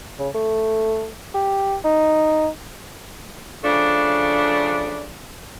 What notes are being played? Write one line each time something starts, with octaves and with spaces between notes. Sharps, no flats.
C#3
A3
G4
D#4
C#3 F3 A3 D4